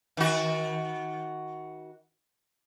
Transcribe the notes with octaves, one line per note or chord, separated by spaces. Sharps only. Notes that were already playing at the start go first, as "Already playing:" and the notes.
D#3 F#4